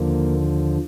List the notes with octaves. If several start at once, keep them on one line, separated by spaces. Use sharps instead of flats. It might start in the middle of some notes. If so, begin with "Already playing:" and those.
Already playing: D#2 D3 F3 A#3